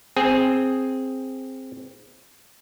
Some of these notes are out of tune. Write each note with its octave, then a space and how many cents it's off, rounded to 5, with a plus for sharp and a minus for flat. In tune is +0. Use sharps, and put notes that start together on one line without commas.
C4 +0 G#4 +0 G#5 +0